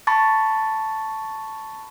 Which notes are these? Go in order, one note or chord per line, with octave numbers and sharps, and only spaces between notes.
A5 B5 C#6 A6